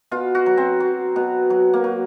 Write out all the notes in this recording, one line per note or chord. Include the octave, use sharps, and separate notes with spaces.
B2 F4
F#4
F#3
C4
F#3
B2
F#3
A#3
F#3